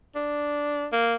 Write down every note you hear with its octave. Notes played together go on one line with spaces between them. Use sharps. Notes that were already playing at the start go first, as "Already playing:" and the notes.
D4
A#3